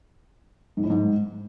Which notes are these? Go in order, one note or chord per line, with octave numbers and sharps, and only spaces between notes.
G#2
A2
G#2